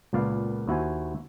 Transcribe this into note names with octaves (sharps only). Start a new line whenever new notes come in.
C#2 A#2 B3 D5 F5
D#2 E4 F#4 C5 G#5